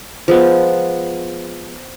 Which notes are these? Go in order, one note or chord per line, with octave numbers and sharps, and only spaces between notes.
F3 G#3 B3